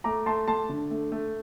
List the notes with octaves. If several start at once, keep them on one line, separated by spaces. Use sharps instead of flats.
A3 A#5 D6
A3 A5 C6
A3 A5 C6
D3
A3
A3